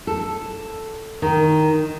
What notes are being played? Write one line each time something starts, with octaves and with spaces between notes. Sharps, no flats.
A4
D#3